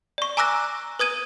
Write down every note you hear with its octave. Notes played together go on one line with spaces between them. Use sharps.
D5 C#6
G#5 A#5 D6 E6 F#6 A#6
B4 D#6 G#6 D#7